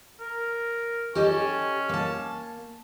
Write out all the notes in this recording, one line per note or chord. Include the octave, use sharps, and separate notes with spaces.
A#4
C#4 G4 A4 D#5
A#3 A5